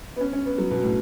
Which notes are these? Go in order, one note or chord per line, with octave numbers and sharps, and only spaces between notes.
B3
C#4
C#4
B3
F#3
B2
A2